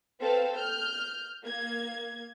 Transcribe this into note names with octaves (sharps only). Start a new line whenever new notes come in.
C4 A4 B4 F5
F6 G6
A#3 G#6